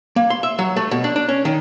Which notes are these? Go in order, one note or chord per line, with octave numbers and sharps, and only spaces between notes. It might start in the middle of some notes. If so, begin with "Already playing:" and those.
A#3
C6
E5
F#3
A3
B2
D4
D4
C#4
D#3